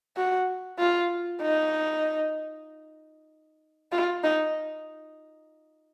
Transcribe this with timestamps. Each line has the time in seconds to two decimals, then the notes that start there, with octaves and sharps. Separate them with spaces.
0.17 F#4
0.79 F4
1.42 D#4
3.92 F4
4.23 D#4